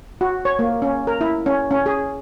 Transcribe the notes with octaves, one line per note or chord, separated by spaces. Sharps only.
F#4
C#5
A#3
C#4
A#4
E4
C#4
C#4
G#4